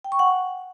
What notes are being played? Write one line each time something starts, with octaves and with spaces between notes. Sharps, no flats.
G5
C#6
F#5